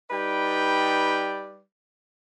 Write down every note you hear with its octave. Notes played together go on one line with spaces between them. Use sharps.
G3 D#4 B4 D5 G5